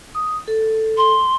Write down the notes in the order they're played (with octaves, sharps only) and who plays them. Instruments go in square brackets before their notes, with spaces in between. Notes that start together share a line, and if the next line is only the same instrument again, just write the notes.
[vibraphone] D#6
A4
[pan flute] C6